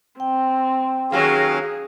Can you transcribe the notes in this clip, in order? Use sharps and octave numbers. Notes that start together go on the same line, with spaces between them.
C4 G5
D#2 F#3 G#3 C#4 G#4 F5